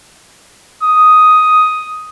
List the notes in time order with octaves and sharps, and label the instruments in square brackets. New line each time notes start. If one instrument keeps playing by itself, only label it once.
[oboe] D#6